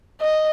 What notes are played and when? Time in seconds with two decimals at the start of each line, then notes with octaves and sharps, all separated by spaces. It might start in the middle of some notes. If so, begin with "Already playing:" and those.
0.21 D#5